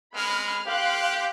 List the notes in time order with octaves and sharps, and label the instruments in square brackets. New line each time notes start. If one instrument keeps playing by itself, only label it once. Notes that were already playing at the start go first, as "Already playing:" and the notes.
[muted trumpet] G#3 [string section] B5 F6
[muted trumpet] G4 [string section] F5 C6 F#6